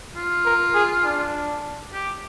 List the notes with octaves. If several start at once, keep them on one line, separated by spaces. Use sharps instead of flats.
F4
A#4
G#4
D4
G4